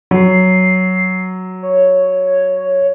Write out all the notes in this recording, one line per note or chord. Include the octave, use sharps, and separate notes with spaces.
F#3 C7
C#5